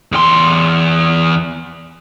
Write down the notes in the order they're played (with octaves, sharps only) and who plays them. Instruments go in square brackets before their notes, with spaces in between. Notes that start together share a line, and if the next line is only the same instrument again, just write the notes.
[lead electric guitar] E2 C6